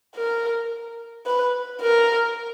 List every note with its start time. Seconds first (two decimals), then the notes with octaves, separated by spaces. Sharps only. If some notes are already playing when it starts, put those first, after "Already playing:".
0.16 A#4
1.26 B4
1.81 A#4